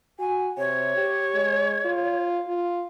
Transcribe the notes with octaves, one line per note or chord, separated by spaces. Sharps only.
F#4 G#5
C3 C#5
G4
G#3
F4
F4